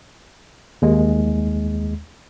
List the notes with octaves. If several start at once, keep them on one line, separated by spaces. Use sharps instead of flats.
D#2 G#3